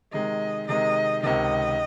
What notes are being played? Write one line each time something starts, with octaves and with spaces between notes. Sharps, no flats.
C3 D#3 G#3 D#5
C3 D#3 G#3 D#5
C#2 C3 D#3 D#5